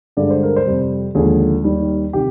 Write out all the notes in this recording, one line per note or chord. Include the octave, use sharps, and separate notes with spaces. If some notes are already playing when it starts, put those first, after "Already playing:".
G2 D3 G#3 D5
C5
A#4
C5
F2 C3 G3
D#2 D3 F3 G#3 G#4
D#2 D#3 G3
C3 D#3 G4